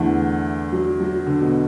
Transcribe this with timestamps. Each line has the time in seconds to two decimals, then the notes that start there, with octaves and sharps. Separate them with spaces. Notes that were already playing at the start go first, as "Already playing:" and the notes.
Already playing: E2 D3 E3 A3
0.72 F#3
1.00 F#3
1.27 D3
1.41 B2